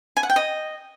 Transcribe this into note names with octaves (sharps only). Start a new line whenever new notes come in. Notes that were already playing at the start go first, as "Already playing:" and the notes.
G#5
F#5
G5
D#5